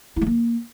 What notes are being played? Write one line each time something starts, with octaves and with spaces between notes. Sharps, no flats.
E4
A3
A#3